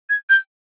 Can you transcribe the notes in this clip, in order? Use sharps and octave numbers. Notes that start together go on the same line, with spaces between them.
G#6
G6